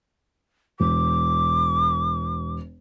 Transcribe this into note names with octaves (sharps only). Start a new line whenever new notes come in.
E1 D6